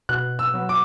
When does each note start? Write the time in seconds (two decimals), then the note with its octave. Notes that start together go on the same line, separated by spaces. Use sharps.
0.09 B2 F#6
0.39 E6
0.54 F#3 B3
0.69 D6